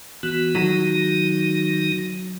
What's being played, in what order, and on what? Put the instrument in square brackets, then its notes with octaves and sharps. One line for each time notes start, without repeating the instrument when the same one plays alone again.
[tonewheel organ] E3 B3 [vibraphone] F#4
[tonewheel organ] D#3 D#4 [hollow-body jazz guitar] F#3